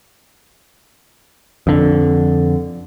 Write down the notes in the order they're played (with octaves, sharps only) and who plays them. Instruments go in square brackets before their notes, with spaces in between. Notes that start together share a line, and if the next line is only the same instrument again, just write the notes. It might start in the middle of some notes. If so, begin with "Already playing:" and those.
[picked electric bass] F2 D3